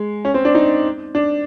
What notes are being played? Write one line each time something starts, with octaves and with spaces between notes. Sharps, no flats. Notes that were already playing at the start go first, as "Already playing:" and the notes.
Already playing: G#3
C#4
C4
D4
D#4
D4